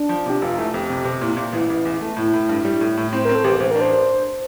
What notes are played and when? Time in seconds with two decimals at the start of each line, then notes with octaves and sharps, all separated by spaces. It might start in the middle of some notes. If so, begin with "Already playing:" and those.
Already playing: D4
0.09 F3
0.26 C3 G4
0.42 F1 F4
0.58 A3 E4
0.73 F2 G4
0.90 C3
1.05 C3
1.21 A#2 E4
1.37 A#2
1.53 A1 E4
1.70 A1
1.85 E2
2.01 A3
2.17 A2 E4
2.34 A2
2.49 G2
2.65 G3
2.81 A2
2.97 A2
3.13 C4 C5
3.25 C4 A#4
3.35 A4
3.44 A1 G4
3.60 A1 C5
3.71 A#4
3.76 D4
3.81 C5